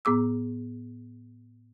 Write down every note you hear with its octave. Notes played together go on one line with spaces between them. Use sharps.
A2 B3 G#4 D6 E6